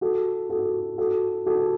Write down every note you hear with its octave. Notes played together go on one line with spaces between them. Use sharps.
F#4 A4
F#4 A4
F#4 A4
F#4 A4